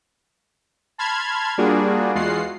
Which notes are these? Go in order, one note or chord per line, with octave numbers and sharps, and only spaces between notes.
A5 B5 C6 F6 G#6
G3 A#3 D4 F4 F#4 G#4
E2 G#3 F4 F#4 F#5 C7